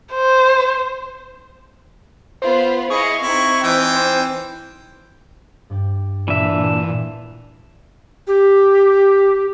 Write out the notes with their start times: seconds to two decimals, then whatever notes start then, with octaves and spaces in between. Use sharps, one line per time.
0.13 C5
2.42 B3 F4 B4 C5
2.90 E4 G#4 D#5 F5 C#6
3.22 C4 D#4 E4
3.64 E3 G5
3.95 C5
5.70 G2 D5 G5
6.28 A#2 E3 D4 E5
8.27 G4